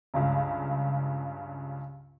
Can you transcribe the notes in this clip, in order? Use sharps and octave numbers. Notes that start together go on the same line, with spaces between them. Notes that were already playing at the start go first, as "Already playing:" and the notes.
C#2 G2 C#3